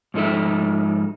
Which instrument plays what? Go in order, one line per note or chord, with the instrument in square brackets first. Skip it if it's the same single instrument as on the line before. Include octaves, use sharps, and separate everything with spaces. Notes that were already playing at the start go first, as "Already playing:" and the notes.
[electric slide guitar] G#2 F3 D#4 A4 E5